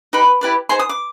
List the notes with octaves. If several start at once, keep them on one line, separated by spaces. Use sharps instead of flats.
D#4 G4 B4 B5
E4 G4 B4 D5
D#4 G#4 C5 C6
D#6
D6